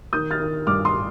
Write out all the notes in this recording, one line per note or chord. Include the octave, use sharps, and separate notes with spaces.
D#3 D#6 G6
F6 A6
D#3
G2 D6 F6
C6 D#6